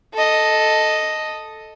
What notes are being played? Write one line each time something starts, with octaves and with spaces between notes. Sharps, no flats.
A4 D#5